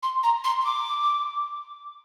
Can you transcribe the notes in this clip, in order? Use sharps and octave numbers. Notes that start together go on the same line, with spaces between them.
C6
A#5
C6
C6
D6